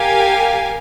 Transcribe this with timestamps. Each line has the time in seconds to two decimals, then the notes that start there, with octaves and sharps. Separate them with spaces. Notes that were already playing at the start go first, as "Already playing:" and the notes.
Already playing: G4 A#4 F5 G#5